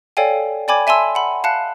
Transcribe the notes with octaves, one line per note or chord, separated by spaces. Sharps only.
A4 C#5 D5 F5 G5 G#5
D5 G5 G#5 B5 D6 G#6
E5 G#5 A5 C6 E6
F#5 B5
F5 A5 F#6 C#7